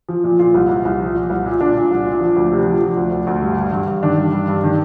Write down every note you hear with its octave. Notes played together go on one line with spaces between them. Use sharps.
F3
A#2
A#2 F4
C2
C2
C2
F3
A#2
C2
A#2
A#2 D4
A#2
C2
A#2
F3
D2
C3
F3
F3
D2
D2
D2
G2
G2
G2
G2
D#3 D4
G2
G2
G2
D#3 D4